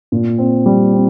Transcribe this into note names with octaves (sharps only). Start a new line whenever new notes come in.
A#2
C4
G3
C4